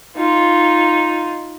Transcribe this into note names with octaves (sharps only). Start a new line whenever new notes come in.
D#4 F4